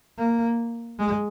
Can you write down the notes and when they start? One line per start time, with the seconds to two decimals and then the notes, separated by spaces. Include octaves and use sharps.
0.18 A#3
0.99 G#3